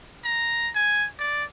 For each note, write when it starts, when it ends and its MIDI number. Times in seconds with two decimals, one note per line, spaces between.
0.24 0.70 82
0.75 1.07 80
1.19 1.44 74